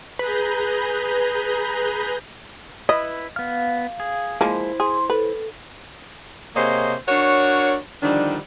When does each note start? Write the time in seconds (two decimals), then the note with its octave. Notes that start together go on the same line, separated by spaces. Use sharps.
0.19 G#4 B4 A#5 G6
2.89 E4 B4 D#5
3.36 B3 F5 F6
4.00 G#4
4.41 F3 G#3 A#3 E4 C5
4.80 G#4 C6
5.10 A4 B4
6.56 C3 A#3 G#4 C5 C#5 D#5
7.09 D4 F#4 A#4 C#5
8.03 D3 D#3 F3 G3 D4